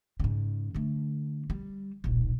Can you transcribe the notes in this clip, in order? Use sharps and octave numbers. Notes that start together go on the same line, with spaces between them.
G#2 C#3
D3 A3
G3
D#1 B1